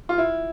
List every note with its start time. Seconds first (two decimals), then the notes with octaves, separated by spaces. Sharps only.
0.09 F4
0.18 E4